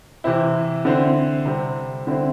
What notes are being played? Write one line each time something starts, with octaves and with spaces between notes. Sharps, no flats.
C3 E3 C4 E4
D3 C4 E4
C3 G3 C4
D3 C4 E4